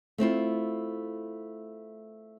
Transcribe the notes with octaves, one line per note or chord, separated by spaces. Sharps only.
A3 C4 E4 F4